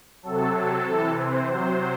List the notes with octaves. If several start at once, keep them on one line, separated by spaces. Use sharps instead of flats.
C3 F#3 A4
A4
C3 E3
C5
C3 F#3 C5